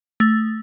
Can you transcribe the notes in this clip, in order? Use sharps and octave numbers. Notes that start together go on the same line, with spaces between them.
A3